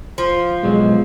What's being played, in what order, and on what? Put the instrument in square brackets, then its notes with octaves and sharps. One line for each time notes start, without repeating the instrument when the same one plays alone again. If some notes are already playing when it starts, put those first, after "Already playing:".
[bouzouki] F3
[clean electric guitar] B1 F#3 [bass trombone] G#3